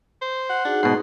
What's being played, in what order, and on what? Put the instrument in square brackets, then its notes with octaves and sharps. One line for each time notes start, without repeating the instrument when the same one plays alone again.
[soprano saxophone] C5
[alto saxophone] F#5
[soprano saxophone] D4 [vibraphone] D#4 F#4 G#4
[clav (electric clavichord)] G#2 B2 [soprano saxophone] C6